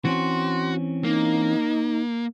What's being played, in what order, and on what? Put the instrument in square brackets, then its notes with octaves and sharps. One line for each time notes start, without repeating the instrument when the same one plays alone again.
[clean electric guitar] E3 C4 C#4 [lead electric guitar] F#4 [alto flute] C6
[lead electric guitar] A#3 [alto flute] D#4